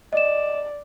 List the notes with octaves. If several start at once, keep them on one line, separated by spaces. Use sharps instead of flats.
D5 D#5 E7